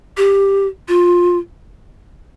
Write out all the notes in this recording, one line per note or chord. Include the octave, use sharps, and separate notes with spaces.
G4
F4